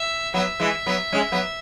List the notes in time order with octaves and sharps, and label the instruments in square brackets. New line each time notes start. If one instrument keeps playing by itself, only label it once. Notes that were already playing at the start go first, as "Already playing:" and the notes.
Already playing: [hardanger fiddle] E5
[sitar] F#3 B3 [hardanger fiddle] E5
[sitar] E3 G#3
F#3 B3
G#3 C#4
F#3 B3